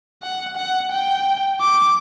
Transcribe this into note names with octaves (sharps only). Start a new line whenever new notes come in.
F#5
F#5
G5
D6